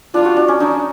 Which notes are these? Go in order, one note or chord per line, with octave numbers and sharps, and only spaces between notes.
D4 F4
F#4
D4
C#4
D4 D#4